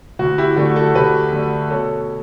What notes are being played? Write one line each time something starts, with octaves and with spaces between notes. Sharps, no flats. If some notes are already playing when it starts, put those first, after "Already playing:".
D2 F#4
E4 G4
D3 A3 D4 F#4 A4
F#4 A4
D2 G4 B4
D3 A3 D4
B2 A4 C#5